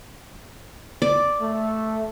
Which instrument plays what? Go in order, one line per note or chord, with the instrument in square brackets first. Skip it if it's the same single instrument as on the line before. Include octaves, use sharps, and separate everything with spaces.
[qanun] D5
[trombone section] A3